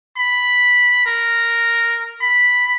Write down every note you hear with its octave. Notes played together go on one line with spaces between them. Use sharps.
B5
A#4
B5